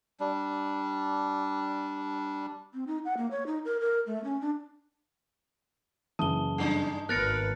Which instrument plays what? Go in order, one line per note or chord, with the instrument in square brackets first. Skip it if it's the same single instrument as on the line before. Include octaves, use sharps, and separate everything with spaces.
[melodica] G3 D4
[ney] C4
D#4
F#5
A#3
C#5
D#4
A#4
A#4
A3
C#4
D4
[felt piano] F#1 E3 D#6 [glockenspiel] A5 G7
[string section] G2 [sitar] G3 D4 D#4
[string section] G#1 B4 [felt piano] B3 [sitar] A#4 [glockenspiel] F#6 A6 C#7